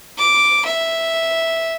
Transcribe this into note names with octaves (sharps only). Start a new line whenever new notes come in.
D6
E5